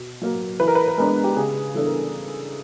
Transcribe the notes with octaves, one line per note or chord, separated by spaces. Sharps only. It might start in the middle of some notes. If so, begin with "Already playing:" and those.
Already playing: B2
F#3 A#3
E3 B4
A#4
B4
B4
G#3 B3 D4 A#4
G4
C#3 G#4
E3 G3 B3 D4 A4
A#4